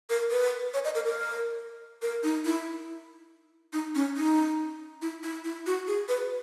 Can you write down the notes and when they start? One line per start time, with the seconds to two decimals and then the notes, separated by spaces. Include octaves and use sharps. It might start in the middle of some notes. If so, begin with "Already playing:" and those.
0.10 A#4
0.31 B4
0.74 C#5
0.85 D#5
0.95 A#4
1.06 A#4
2.02 A#4
2.23 D#4
2.45 E4
3.73 D#4
3.95 C#4
4.16 D#4
5.02 E4
5.23 E4
5.44 E4
5.66 F#4
5.87 G#4
6.09 B4